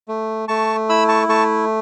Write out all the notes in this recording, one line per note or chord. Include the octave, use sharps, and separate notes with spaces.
A3
A3 A5 C#6
E4 B5 E6
A5 C#6
A3 A5 C#6